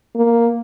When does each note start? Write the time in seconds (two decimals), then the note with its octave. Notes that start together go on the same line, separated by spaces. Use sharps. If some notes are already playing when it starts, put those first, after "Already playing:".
0.16 A#3